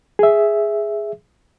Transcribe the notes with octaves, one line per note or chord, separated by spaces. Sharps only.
G#4 E5